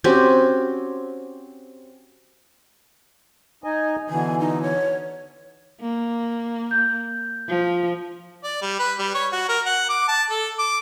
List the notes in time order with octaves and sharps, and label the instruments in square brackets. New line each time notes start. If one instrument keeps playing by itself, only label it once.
[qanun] C4 C#4 F#4 G4
[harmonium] D#4 D#5 G#5
[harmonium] B2 D3 E3 [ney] G#5
[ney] D#4
C#5
[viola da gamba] A#3
[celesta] G6
[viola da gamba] F3
[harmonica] D5
G3
B4
G3
C#5
F#4
A#4
F#5
D6
A5
A4
D6